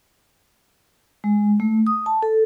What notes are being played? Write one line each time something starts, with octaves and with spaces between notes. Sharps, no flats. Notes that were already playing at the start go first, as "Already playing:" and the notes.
G#3
A3
D#6
A5
A4